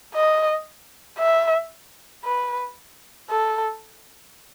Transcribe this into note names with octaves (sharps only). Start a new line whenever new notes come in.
D#5
E5
B4
A4